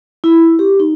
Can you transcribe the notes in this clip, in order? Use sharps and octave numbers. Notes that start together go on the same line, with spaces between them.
E4
G4
D#4